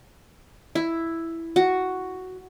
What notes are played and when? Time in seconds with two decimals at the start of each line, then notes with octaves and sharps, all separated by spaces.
0.75 E4
1.56 F#4